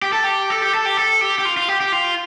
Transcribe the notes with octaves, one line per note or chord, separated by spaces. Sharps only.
G4
A4
G4
A4
G4
A4
G4
A4
G4
G4
F4
F4
G4
G4
F4